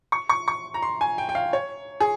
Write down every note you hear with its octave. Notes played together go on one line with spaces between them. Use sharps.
C#6
C#6
C#6
A#5
C6
G#5
G5
G5
F5
C#5
G#4